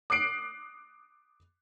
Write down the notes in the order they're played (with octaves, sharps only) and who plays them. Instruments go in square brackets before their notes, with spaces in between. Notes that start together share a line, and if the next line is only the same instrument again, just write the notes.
[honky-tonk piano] D6 D#6 F#6 C7 D7